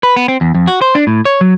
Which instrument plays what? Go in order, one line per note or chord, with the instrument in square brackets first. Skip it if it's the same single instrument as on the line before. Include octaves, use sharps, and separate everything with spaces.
[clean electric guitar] B4
B3
C4
E2
F2
F#4
C5
D4
A2
C#5
F#3